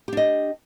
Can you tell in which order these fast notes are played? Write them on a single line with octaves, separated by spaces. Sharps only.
G4 D4 D#5